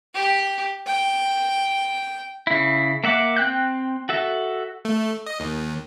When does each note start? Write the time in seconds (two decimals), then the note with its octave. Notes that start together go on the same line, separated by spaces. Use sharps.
0.15 G4
0.86 G5
2.47 C#3 E4
3.04 A#3 E5 F#5 D6
3.37 C4 G5 F#6 G6
4.09 F#4 A4 E5
4.85 A3
5.26 D#5
5.40 D#2